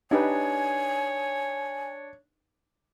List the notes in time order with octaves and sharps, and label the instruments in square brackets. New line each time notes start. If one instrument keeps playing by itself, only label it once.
[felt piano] D4 [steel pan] D#4 G4 B4 [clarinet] C#5 [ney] G#5